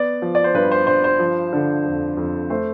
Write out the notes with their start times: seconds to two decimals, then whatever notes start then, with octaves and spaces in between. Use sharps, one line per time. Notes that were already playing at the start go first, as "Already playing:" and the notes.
Already playing: B3 D5
0.22 F3
0.35 D5
0.44 C5
0.55 G2 B4
0.71 C5
0.87 G2 C5
1.04 C5
1.19 F3
1.53 D3
1.86 F2
2.17 F2
2.50 A3 C5